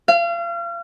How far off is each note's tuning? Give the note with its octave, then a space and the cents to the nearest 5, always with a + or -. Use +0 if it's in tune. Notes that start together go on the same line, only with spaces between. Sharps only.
F5 -35